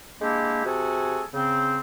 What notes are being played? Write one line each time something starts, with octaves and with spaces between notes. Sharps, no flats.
G#3 A#3 D4 E4 G4
C3 F#4 G#4 A4 G#5
C#3 C4